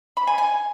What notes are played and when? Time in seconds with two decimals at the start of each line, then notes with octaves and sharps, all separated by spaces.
0.17 B5
0.27 G#5
0.38 G#5